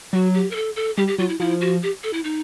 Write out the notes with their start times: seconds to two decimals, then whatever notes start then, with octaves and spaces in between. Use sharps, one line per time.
0.13 F#3 F#4
0.34 G4
0.51 A#4
0.56 A4
0.76 A4
0.97 G3 G4
1.07 G4
1.18 F#3 F4
1.29 E4
1.40 F3 E4
1.61 F#4
1.83 G4
2.04 A4
2.13 E4
2.24 D#4